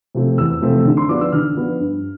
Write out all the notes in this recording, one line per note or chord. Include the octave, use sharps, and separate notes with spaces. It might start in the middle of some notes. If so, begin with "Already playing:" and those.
C3 F3 A3 C4
E2 E6
C3 F3 A3 C4
D3
C6
F3 B3 D4 D6
E6
D3 F6
F3 B3 D4
G2